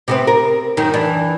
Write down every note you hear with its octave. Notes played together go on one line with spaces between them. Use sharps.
C3 B3 C4
A#4
F#2 D#3
E3 D4